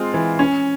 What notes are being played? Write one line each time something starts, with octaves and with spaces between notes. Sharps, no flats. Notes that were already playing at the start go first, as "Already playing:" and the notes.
Already playing: G#3 C4 F4
E3
C#4